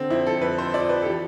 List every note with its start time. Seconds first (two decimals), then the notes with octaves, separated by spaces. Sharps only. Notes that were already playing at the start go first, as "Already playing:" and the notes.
Already playing: D3 C4
0.10 F2 E4
0.27 A4
0.42 F2 B4
0.58 C5
0.74 F3 D5
0.89 B4
1.02 A4
1.05 E3 G4